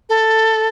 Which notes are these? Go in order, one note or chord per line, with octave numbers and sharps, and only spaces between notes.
A4